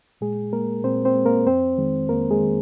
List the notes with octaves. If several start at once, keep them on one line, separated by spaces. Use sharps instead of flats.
A#2 G#3 G#4
G#3 A#3 A#4
A#2 C4 C5
C4 C5
G#3
A#3 A#4
F2 C4 C5
D#3 G#3
F2 A#3 A#4
G#3 G#4
D#3 G#3